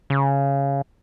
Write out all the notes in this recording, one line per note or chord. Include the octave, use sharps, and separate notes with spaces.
C#3